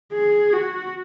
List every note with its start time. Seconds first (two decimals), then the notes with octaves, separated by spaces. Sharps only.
0.13 G#4
0.53 F#4